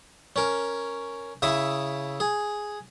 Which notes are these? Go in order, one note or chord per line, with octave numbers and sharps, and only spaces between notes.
C#4 A#4
C#3 E4 E5 D#6
G#4